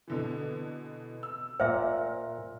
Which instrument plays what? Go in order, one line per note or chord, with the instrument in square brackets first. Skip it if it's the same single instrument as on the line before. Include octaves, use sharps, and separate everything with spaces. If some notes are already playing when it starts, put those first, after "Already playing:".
[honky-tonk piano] B2 D3 E3
E6
[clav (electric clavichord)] A#2 F#5 [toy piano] C5 E5